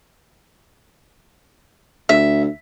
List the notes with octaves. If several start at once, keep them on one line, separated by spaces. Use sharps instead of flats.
D2 E5